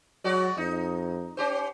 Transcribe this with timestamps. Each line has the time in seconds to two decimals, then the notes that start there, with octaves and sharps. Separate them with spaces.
0.24 F#3 G#3 F#4 D5
0.57 F2 D#4
1.37 C#4 G4 C5